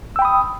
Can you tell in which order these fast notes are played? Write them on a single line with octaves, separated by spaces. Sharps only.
E6 G5 B5 D#6